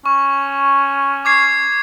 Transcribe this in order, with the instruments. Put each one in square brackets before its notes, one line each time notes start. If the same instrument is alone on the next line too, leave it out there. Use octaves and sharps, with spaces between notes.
[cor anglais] C#4 [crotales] C#6
[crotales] D6 G#6 C7